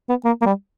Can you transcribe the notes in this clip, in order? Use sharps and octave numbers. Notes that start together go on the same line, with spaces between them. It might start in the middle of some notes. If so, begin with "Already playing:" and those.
B3
A#3
A#3
G3